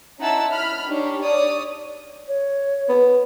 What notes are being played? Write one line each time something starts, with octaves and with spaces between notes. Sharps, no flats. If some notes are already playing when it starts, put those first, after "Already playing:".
C#4 D#4 E4 F#5 A5 E6
B5 F6
D4 D#4 G4 C#5
C#5 D5 D#6
C#5
B3